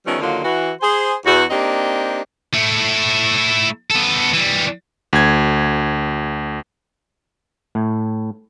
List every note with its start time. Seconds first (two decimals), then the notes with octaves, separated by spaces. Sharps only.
0.05 D#3 F3 G3 A3 B3 C#4
0.20 D#2 D3 D#3 F#3 A#3 F4
0.44 E3 F#4
0.81 G#4 C5
1.25 E2 F#4
1.50 A#3 C4 D4 D#4 G4
2.54 A3 E4
3.91 B3 A4
4.33 E3 G3
5.13 D2 G#6
7.75 A2